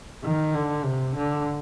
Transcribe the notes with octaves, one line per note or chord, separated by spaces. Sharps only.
D#3
D3
C3
D3